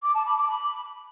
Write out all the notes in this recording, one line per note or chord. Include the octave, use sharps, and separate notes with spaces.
D6
A5
B5
D6
B5